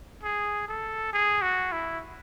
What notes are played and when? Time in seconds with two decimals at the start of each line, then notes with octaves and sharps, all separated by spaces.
0.23 G#4
0.68 A4
1.13 G#4
1.42 F#4
1.72 E4